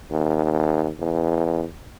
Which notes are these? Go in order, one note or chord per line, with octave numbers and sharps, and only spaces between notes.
D#2
E2